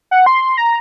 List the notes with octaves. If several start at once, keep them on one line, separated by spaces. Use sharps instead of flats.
F#5
C6
A#5